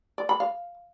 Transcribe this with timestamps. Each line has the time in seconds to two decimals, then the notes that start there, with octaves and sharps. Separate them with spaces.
0.18 D5
0.29 B5
0.40 F5